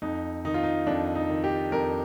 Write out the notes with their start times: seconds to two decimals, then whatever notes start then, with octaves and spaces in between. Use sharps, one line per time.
0.02 F2 D#4
0.45 D#3 D#4
0.54 F4
0.63 D#4
0.87 F2 D4
1.15 D#4
1.30 D#3
1.44 G4
1.72 F2 A#4